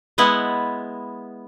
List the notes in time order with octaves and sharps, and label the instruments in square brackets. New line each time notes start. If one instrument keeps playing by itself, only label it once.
[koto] G#3 B3 E4 F#5